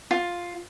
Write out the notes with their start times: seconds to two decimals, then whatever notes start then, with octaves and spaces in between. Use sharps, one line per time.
0.11 F4